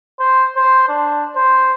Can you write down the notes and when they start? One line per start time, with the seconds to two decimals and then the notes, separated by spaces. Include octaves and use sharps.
0.19 C5
0.56 C5
0.88 D4
1.36 C5